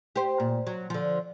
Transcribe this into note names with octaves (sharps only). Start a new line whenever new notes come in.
G4 C5
A#2
F#3
D3 F3